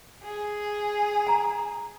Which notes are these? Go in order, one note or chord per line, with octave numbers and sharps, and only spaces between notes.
G#4
G#5 A#5